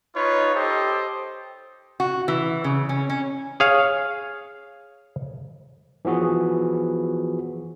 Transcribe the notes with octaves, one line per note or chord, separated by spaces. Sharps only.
D#4 F4 B4 C#5
G4 A4 C5 D#5
F#4
E3
C#3
C#4
C#4
G#4 C#5 F5
E3 F3 B3 F#4 G#4